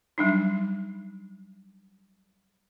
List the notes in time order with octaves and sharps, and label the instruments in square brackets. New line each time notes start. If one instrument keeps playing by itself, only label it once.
[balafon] F#3 G3 D4 D#4